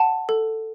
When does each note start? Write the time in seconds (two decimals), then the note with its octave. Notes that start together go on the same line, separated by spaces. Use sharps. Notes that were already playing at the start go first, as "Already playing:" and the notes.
Already playing: F#5 A5
0.29 A4